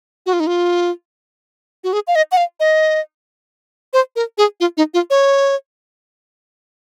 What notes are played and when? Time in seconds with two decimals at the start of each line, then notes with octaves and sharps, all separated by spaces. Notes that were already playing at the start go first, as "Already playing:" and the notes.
0.26 F#4
0.33 F4
0.40 D#4
0.47 F4
1.84 F#4
1.93 G#4
2.07 F5
2.15 D#5
2.32 F#5
2.37 F5
2.60 D#5
3.93 C5
4.16 A#4
4.38 G#4
4.60 F4
4.77 D#4
4.94 F4
5.10 C#5